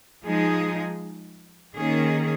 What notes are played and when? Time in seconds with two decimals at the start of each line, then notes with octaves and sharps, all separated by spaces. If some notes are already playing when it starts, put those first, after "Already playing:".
0.24 F3 G#3 D#4 G#4
1.76 D#3 A#3 C#4 G#4